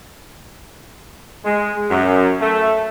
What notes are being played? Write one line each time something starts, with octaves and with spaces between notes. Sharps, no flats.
G#3
F#2
A3